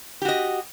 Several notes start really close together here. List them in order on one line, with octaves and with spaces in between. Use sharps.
G4 F#4 D#5